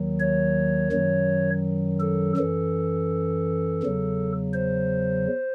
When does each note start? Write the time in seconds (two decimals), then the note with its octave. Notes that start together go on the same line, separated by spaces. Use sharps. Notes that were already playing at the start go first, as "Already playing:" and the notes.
Already playing: D#2 D#3 F#3
0.20 C#5
0.92 F#2 D#3 F#3
2.00 A4
2.37 F#2 E3 A4
3.82 E2 C#3 F#3
4.54 C5